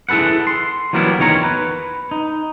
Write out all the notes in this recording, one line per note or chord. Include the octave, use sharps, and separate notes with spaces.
E4 G#4 A4 B4 F#5
C6
E3 F#3 G3 A#3 B3 E4
E2 D#3 F4 C#5 A#5
B4
D#4